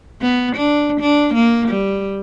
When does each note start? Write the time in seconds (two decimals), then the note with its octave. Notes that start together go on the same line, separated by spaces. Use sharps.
0.22 B3
0.56 D4
1.00 D4
1.34 A#3
1.69 G3